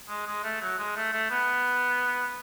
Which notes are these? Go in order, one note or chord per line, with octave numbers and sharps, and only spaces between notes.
G#3
G#3
A3
F#3
G#3
A3
A3
B3